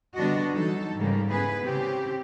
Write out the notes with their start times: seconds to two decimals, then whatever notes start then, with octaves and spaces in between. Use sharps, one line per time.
0.15 D3 G3 B3 D4 F#4 D#5
0.54 E3 F#3 D#4 A4
0.95 G#2 C#3 G3 A#3
1.29 B3 E4 G#4 B4
1.63 C#3 C4 G4